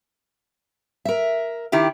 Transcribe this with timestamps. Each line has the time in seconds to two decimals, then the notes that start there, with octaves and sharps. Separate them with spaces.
1.05 A#4 E5
1.72 D#3 E4 G4